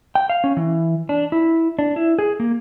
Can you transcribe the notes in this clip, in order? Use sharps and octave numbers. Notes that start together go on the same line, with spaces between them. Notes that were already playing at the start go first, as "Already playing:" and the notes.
G5
F5
C#4
E3
D4
E4
D4
E4
G#4
A#3